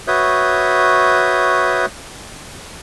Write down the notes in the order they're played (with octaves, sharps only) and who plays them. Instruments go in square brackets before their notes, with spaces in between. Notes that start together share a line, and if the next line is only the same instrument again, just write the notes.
[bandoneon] F#4 B4 C#5 E5 D#6 G6